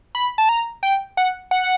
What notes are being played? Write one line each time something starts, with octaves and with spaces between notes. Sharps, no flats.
B5
A5
A#5
G5
F#5
F#5